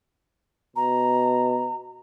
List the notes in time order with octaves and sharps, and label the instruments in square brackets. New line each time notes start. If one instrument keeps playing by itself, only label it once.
[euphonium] B2 [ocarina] A#5